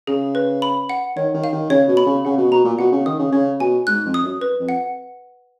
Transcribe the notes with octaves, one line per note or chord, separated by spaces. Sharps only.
C#3 G#4
B4
B5
F#5
D#3 C#5
D#3
F5
D#3
C#3 C#5
B2
B5
C#3
C#3 F#5
B2
B2 A#5
A#2
B2 F#5
C#3
D#3 D#6
C#3
C#3 C#5
B2 G#5
G#2 F#6
F2
D#6
F#2
B4
F2
F#5